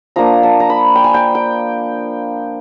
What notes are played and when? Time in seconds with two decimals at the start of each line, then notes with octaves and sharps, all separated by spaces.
0.16 F3 A#3 D4 A#5
0.43 A5
0.60 A#5
0.70 B5
0.95 G5
1.04 G#5
1.14 G5
1.35 G5